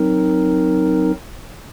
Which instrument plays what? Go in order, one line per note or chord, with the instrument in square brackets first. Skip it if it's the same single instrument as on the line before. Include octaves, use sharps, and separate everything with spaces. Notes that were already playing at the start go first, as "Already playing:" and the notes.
Already playing: [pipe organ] F#3 C4 D#4 A#4